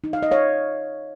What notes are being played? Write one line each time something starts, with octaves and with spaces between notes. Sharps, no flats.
D#4
F5
D#5
C#5 F5